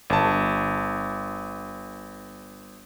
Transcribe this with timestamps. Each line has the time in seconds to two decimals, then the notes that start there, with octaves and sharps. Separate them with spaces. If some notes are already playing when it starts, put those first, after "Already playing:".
0.10 G1 A5